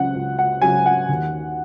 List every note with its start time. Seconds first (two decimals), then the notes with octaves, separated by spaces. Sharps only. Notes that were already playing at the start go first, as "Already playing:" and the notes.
Already playing: C#2 C#3 F#3 F#5
0.15 C#2
0.39 F#5
0.62 C#3 F#3 G#5
0.86 F#5
1.09 D#2